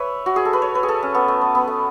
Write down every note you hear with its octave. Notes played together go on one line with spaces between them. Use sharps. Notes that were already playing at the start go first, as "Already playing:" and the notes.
Already playing: B4 C#5 E5
F#4
G#4
A4
B4
C#5
B4
G#4
A4
C#4
B3
A3
B3
B3
A3